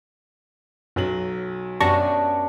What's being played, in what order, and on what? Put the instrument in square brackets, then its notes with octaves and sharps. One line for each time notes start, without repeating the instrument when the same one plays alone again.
[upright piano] B1 F#3 F#7 [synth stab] F#2
[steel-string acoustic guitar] F#2 [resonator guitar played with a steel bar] B3 D4 G4 [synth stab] A5 C#6 A#6